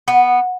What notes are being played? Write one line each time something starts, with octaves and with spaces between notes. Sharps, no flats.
B3